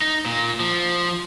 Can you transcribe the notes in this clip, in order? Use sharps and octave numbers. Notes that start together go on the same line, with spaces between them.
D#4
A#2
F3